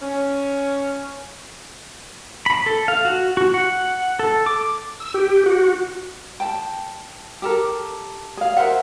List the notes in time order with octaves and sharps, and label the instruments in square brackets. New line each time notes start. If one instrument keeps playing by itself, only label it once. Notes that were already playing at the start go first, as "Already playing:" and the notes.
[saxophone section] C#4
[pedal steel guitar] B5
A4
F5
F#4
F#4
F#5
A4
D6
[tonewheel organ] E6
G4
F#4
[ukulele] G5 A5
G4 A4 A#4
G#4 F5
A#4 C5 E5 F#5